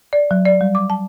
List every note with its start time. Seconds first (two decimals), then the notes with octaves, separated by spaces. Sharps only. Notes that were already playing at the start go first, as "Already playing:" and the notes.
0.13 D5
0.31 F#3
0.46 D5
0.61 G3
0.75 D6
0.90 A5